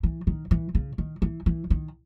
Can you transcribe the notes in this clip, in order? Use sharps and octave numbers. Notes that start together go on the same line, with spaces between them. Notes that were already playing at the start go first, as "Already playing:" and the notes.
E3
D#3
E3
C#3
D#3
E3
E3
D#3